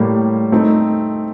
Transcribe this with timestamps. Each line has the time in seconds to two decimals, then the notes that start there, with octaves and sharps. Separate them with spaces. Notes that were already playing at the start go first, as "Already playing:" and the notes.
Already playing: A2 G3 A#3
0.52 A3 C4 D#4